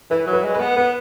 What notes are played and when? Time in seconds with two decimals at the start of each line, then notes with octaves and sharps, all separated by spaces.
0.10 E3 B4
0.26 F#3
0.33 B4
0.43 G#3
0.54 B4
0.60 B3
0.77 B3 B4